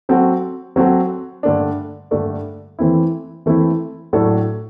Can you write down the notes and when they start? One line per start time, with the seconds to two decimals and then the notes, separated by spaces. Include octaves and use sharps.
0.09 F#3 C4 F#4 A4
0.76 F#3 C4 F#4 A4
1.43 G2 D3 A3 D4
2.11 G2 D3 A3 D4
2.79 E3 A3 C4 E4
3.46 E3 A3 C4 E4
4.13 A2 F#3 A3 D4 A4